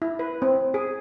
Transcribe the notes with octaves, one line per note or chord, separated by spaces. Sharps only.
E4
B4
C4
G#4